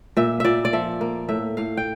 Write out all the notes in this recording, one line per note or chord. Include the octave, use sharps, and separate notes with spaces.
A#2 E5
A#2 D5 E5
D5
F3 E5
A#3
A2 E5
A2 F5
G5